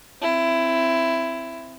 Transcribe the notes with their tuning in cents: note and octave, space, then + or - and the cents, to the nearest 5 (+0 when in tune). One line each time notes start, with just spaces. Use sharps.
C4 +0 E4 +15